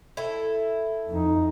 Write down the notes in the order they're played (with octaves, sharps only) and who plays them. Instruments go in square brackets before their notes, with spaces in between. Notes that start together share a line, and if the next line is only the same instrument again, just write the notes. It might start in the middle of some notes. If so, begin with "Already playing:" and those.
[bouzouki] E4 A4
[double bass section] F2 [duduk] D#4